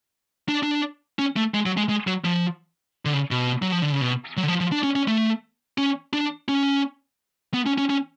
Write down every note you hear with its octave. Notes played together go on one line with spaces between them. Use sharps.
D4
D4
C#4
A3
G#3
F#3
G#3
G#3
F#3
F3
D3
C#3
B2
F#3
F3
D3
C#3
B2
F#3
D3
F3
F3
D4
C#4
C#4
A3
C#4
D4
C#4
B3
C#4
C#4
C#4